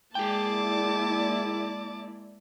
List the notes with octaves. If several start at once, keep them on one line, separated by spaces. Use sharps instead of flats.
G#3 A#3 E4 G#4 D5 G5 A5 D6